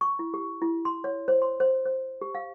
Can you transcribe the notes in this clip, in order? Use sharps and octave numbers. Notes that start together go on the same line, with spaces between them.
C#6
E4
G4
E4
C6
C#5
C5
C6
C5
C5
G4
F5